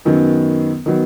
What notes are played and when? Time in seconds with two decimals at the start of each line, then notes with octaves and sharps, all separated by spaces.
0.05 F#2 D#3 F#3 B3
0.86 D#3 F#3 B3